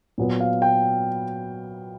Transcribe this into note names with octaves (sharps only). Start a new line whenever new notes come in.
A#2 F#3 B3
F5
G5